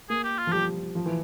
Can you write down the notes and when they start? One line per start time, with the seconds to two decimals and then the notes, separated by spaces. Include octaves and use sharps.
0.10 A#3 G#4
0.24 G4
0.39 F4
0.47 F3
0.52 G3 G4
0.95 F3
1.06 E3